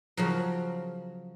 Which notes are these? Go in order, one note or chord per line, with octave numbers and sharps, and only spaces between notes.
C#3 F3 F#3